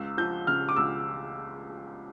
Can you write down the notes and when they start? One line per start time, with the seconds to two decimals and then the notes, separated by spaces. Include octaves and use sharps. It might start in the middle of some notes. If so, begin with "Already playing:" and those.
Already playing: C#2 E6
0.18 F3 G6
0.47 C#3 F6
0.69 D6
0.76 C#2 E6